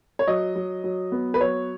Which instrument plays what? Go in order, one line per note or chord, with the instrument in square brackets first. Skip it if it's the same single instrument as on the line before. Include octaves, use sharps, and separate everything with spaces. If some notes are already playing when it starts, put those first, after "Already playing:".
[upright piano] C#5
F#3 D#5
F#3
F#3
B3
B4
F#3 C#5